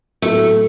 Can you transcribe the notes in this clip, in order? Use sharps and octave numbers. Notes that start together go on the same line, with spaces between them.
A2 F#3 A3 B3